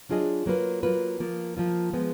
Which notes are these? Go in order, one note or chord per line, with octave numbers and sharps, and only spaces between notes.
F#3 D4 F4 G#4 D#5
F#3 A#3 F4 B4
F#3 A#3 F4 B4
F3 A#3 F4
F3 A#3 F4
F3 G#3 B3